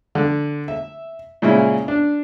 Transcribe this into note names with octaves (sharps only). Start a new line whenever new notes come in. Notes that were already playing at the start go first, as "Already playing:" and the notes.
D3
E5
A#2 C#3 G#3 C#4 E4
D4